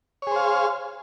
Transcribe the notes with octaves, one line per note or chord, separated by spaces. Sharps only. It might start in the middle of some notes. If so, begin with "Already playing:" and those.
G#4 C5 C#5 F5